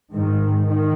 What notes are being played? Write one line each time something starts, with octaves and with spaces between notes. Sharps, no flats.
G#2 D#3
D#3